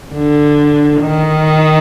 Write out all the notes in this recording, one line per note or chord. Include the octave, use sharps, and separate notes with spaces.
D3
D#3